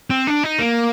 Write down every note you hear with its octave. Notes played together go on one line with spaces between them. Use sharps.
C4
D4
D#4
A#3